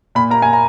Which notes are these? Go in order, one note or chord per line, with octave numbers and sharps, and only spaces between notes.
A#2 B5
A#3 A#5
A#2 G#5
A#5